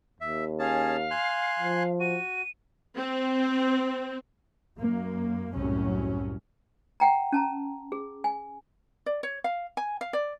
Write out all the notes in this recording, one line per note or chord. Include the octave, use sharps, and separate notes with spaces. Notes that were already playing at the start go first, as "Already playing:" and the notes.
D#2 E5
C#4 G#4 F5 A5
G#5 C6 F#6
F3
F#4 D#7
C4
F#2 A#3
C2 F#2 A2 F#3 C#4
F#5 G5 A#5
C#4 A5 A#5
G#4
G#5
D5
C#5
F5
G#5
F5
D5